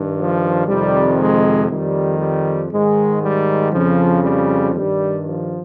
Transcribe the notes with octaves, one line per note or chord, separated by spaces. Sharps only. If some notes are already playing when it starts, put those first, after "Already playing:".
Already playing: G2 D#3
F3
F2 C3 D#3 G3
G#3
F2 D#3 G3
G3
G#2 D#3 G#3
G3
F2 C#3 F3
G3
G2 D#3 G3
F3